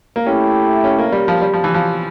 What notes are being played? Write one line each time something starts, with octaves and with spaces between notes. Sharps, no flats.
A#3
A3 C#4 E4 G4
C#4
A#3
G3
F3
G3
F3
E3
F3